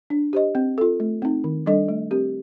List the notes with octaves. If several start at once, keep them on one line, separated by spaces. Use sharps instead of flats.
D4
G4 C5 D#5
C4
F4 A4
A3
C4 D#4
D#3
G3 D4 A4 D#5
A3
C4 G4 A#4